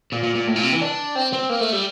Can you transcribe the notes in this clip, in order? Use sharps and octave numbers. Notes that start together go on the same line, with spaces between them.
A#2
A#2
A#2
A2
A#2
C3
E3
D4
C4
C4
A#3
A3
G3